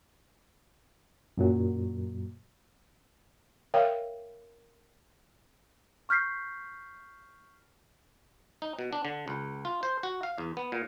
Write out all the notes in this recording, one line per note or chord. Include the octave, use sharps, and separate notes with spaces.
F#2 A#2 F#3
A#4 C#5 E5 F5 G5
C#6 F6 G6 B6 C7
D#4
B2
D4
D3
C#2
F4
C5
F#4
F5
E2
B3
A#2